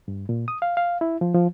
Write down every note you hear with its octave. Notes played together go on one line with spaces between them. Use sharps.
G2
A#2
D#6
F5
F5
E4
F3
F3